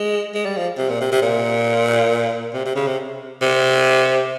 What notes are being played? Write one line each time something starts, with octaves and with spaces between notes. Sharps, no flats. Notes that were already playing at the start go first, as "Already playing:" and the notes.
Already playing: G#3
G#3
G3
F3
C3
A#2
C3
C3
A#2
C3
C3
C#3
C3
C3